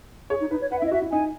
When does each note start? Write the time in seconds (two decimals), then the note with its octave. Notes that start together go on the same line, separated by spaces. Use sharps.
0.30 G#4 C#5
0.41 D#4
0.51 D#4 B4
0.62 C#5
0.71 B4 F#5
0.79 E5
0.82 E4
0.86 D#5
0.92 F#4 E5
1.02 E4
1.12 D#4 G#5